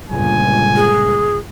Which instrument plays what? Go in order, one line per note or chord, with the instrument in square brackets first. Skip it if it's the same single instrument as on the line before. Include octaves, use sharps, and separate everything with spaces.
[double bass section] G1 C#2 A#2 [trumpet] G#5
[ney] G#4